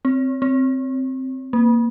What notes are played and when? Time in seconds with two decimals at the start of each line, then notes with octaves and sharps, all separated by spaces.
0.05 C4
0.42 C4
1.53 A#3